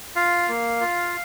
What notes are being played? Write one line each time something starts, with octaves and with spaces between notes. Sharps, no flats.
F4 F5
A#3
F4